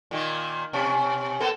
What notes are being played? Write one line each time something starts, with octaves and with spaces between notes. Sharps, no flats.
A#2 D#3 A#3
B2 C#4
A#3 B3 A4